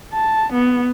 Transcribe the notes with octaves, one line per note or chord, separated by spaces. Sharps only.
A5
B3